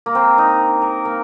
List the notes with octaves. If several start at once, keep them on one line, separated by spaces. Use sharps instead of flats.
A#3
C4
D#4
A#4
A#3